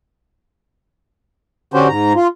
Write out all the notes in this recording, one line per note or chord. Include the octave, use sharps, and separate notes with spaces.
D3 C#4 F#4 G4 C5
G#2 A#5
F4